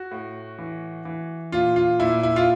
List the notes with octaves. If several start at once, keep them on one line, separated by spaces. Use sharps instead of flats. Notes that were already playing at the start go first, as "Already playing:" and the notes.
Already playing: F#4
A2
E3
E3
A#2 F4
F4
A#2 E4
E4
F4